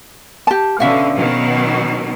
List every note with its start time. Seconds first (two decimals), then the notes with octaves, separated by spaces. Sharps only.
0.47 G4 A5
0.80 B2 D3 C#4 E5 F5
1.15 B2 D#3 F#3